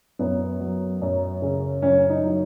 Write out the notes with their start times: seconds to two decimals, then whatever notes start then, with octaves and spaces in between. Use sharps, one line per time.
0.19 F#2 B3
0.60 F#3
1.02 F#2
1.42 C#3
1.82 F#2 C#4
2.10 D#4
2.23 F#3